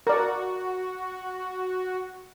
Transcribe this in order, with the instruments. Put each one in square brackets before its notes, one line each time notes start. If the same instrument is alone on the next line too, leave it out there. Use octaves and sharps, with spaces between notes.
[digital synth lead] F#4 [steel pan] A#4 D5